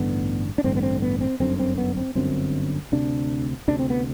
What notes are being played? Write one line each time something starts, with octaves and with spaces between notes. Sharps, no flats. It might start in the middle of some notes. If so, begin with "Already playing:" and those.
Already playing: A1 G2 D3 B3
D4
A1 G2 D3 C4
B3
C4
B3
C4
G1 F#2 D3 C4
C4
B3
C4
G1 F#2 D3 C4
D2 C3 D4
D2 C3 D4
C4
B3